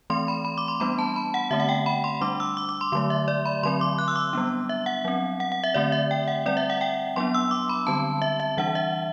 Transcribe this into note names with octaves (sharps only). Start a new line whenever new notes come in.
E3 A3 C4 C6
B5
B5
D6
C6
G3 B3 D4 B5
A5
B5
F#5
D3 A3 C4 E5
F#5
G5
B5
C6
G3 D4 D6
E6
D6
D6
C6
D3 F#3 A3 C6
E5
D5
B5
D3 F#3 C4 C6
D6
F#6
E6
D6
G3 B3 D4
E5
F#5
F#3 C4
F#5
F#5
E5
D3 A3 C4 D5
E5
G5
F#5
G3 C4 D5
E5
F#5
G5
F#3 B3 D4 C6
E6
D6
B5
D3 G3 C4 A5
E5
E5
E3 G3 D4 F#5
E5